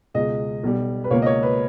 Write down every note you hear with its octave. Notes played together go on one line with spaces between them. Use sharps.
C#2 B2 G#3 D#5
B1 B2 G3
B4
C#2 B2 A#3 C#5
D#5
C#5
B4